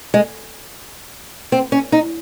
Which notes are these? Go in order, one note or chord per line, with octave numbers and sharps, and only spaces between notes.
G#3
C4
C#4
D#4